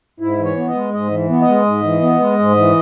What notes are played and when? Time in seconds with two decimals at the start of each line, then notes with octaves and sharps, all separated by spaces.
0.20 G#2 E4
0.38 E3
0.45 C#5
0.57 B3
0.68 D#5
0.75 G#3
0.94 G#2 D#5
1.11 E3
1.29 B3
1.42 D#5
1.48 G#3
1.66 G#2
1.84 E3
2.02 B3
2.20 G#3
2.39 G#2
2.57 E3